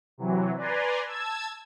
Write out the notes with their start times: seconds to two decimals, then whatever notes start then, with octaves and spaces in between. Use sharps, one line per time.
0.18 C3 E3 F#3
0.56 B4 D5 G#5 A#5 C6
1.06 A5 E6 G#6